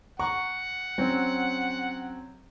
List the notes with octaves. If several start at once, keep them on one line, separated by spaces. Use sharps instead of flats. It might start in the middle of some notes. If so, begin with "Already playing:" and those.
F#5 A#5 C#6
F#3 C4 C#4